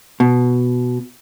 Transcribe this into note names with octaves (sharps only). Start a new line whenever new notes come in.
B2